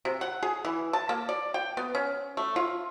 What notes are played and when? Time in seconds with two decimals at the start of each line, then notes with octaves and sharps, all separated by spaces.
0.05 C3
0.21 F#5
0.43 G#4
0.65 E3
0.93 A5
1.09 A#3
1.29 D5
1.54 G5
1.77 B3
1.95 C#4
2.37 A3
2.56 F4